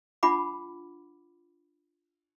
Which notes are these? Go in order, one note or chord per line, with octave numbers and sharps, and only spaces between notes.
D4 F4 F#5 B5 D6